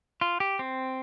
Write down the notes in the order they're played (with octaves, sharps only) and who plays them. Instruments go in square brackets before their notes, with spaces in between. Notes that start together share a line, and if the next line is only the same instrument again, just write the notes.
[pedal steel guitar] F4
G4
C4